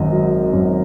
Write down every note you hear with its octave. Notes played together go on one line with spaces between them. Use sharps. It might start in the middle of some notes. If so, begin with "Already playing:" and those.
Already playing: G#1 F#2 D#5
F#3
F#2